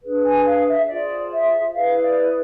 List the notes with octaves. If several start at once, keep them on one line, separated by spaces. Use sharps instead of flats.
D4 G#4 B4
G#5
F5
E5
F4 G#4 C5 D5
E5
E4 G#4 B4 F5
D5